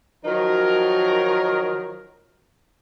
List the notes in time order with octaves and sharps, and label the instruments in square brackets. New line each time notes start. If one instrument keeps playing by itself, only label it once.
[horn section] D#3 F3 F#3 D#4 A#4